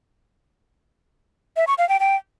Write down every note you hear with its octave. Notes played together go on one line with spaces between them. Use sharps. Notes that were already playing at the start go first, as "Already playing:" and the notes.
E5
C#6
F5
G5
G5